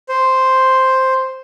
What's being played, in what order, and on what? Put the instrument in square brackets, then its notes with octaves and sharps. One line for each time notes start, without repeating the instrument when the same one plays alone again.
[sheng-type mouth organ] C5